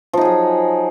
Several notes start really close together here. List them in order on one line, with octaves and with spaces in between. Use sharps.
F3 D#4 G#4 F#3